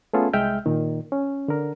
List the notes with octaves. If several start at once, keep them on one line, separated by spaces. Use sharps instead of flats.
A3 B3 C#4 F4 G#4 A4
C2 G#3 E5 G5 F6 G6
A#2 D#3
C#4
D3 A#4